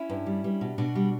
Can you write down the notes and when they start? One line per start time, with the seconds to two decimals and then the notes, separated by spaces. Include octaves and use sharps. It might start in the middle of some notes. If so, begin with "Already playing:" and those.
Already playing: C#4 E4
0.10 G2
0.26 G3
0.44 G3
0.61 B2
0.78 B2 D4 F#4
0.95 G3